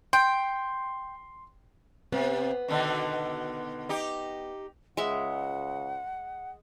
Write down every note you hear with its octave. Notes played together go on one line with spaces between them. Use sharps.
G5 C6
C3 B3
B2 D3 D#3
D#4 G4
C#2 G#3 E5 F#5